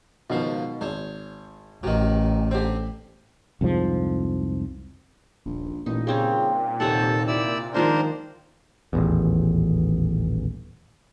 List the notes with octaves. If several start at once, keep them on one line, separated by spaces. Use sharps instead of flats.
C#2 B2 D#3 F3 C5 F5
G#1 C5 C#5
A1 C3 D#3 F#4
D3 C4 G4 C5
C2 F2 G#2 F3
D#1 A#1
A1 A#2 D#4
C#3 G3 C4 C#4
D#2 C3 A4 C#5 F#5 A5
E4 D5 E6
G#2 D#3 F3 A#3 D4 A#4 C5
D#1 A1 E2